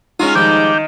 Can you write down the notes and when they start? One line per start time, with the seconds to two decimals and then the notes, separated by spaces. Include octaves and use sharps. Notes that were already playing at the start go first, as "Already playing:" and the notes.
0.20 G#3 C#4 D#4 F4 F#4 D#6
0.35 D#3 F3 G3 G#3 D6 G6